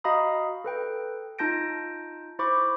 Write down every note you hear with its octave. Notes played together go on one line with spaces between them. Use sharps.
F#4 D#5 F5 A#5 B5 D#6
A4 B4 G5
D#4 F4 A5 G6 A#6 D7
E4 C5 B5 C#6 D6